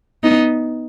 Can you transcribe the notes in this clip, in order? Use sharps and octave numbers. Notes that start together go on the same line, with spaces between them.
B3 D#4